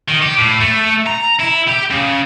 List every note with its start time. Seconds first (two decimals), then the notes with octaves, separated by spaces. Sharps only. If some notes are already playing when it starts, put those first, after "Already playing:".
0.09 D#3
0.22 G4
0.38 A2
0.61 A3
1.06 A#5
1.40 E4
1.68 G4
1.91 C#3